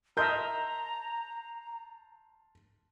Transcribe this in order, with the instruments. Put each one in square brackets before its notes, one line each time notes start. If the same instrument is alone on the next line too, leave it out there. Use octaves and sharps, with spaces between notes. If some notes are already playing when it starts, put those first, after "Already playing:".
[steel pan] A#4 D#5 E5 [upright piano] A5 C6 G6 [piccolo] A#5